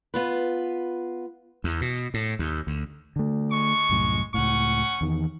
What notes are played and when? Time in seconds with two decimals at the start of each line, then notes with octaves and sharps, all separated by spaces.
0.14 B3 F4 B4
1.64 E2
1.81 B2
2.14 A2
2.39 D#2
2.67 D2
3.16 D3 A3
3.51 G#3 C#6
3.89 C2 F#2 A2
4.34 C#2 A2 C#4 F#5 C#6
5.01 E2 D#3